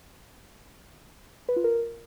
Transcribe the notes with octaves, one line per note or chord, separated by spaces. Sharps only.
B4
F4
A#4